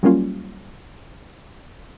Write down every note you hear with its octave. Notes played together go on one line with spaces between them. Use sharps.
F#3 G3 A#3 C#4 F4